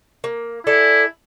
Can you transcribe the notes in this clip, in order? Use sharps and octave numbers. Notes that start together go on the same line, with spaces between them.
A#3
E4 A4 D5 G#5